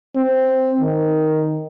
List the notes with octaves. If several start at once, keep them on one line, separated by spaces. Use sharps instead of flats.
C4
D#3